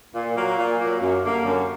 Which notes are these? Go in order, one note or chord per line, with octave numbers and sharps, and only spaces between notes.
A#2
F#3 A#3
A#2
F#3 A#3
F#2
D3 G3 A#3
F#2